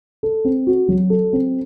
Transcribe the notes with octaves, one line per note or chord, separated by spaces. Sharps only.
A4
C4
F#4
F#3
A4
C4